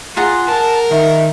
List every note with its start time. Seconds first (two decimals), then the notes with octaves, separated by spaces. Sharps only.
0.17 F4 G#4 F#5 A#5
0.48 A#4 A5
0.91 D#3 E5